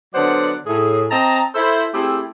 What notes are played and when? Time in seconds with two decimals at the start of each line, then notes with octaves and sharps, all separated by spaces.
0.15 D3 F#3 B3 C5 D5 F#5
0.67 A2 G#4
1.11 C4 D#5 A5 A#5
1.55 E4 A4 C5
1.94 A3 C4 E4 G4 G#4